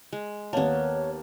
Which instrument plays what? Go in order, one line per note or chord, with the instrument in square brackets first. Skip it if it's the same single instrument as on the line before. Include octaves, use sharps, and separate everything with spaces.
[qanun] G#3
[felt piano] D#2 A5 [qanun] A#3 B3 [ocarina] C#5